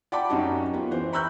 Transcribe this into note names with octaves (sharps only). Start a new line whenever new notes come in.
D5 F#5 G5 A5 B5 D6
F#2 C#4 D#4 F#4 G4
B3 F4 G4
E3 C5
A#5 B5 C#6 E6 F#6 G6